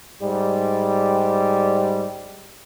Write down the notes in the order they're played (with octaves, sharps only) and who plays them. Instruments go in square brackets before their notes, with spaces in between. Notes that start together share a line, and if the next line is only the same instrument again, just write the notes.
[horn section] G#2 G3